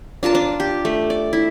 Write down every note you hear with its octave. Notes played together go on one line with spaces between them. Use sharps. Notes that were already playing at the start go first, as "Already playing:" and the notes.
D4 F4 A#4 A5
D4
G4
A3
D5
E4